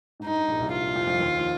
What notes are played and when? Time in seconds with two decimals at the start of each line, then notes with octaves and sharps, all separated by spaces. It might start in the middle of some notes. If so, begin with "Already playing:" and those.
0.20 G#2
0.24 G2 D#4
0.35 G2
0.48 A#1 A#2
0.60 C2 C3
0.72 F4
0.96 F2 F3
1.07 F2 F3
1.20 D#2 D#3
1.38 F3